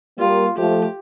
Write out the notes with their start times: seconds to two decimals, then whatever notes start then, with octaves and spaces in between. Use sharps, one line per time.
0.19 G3 A#3 F4
0.57 F3 A3 G4